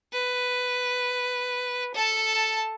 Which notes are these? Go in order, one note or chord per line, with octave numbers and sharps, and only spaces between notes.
B4
A4 A5